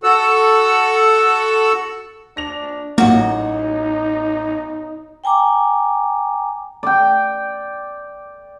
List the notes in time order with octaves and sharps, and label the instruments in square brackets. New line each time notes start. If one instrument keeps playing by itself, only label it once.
[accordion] F#4 A4 F#5 E6
[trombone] D4 [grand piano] A#6 F7
[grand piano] A1 F#3 F#5 [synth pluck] A#3 [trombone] D#4 [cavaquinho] F#4 D#5
[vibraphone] G5 G#5 A#5 D6
[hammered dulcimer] D5 G5